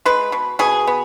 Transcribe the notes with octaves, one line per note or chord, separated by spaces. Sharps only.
G#3 B4
B2
B2 G#4
B3